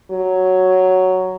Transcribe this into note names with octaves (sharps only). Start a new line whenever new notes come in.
F#3